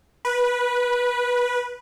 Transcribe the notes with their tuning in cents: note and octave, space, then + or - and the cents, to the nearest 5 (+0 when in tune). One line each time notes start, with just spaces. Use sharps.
B4 -15